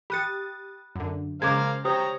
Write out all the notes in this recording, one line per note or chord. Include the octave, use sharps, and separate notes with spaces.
G4 B5 D#6 F#6 A6 C#7
F#2 D3
C#3 G#3 A#4 C5 F5 D6 G#6
G4 C5 C#5 G5 A#5 D#6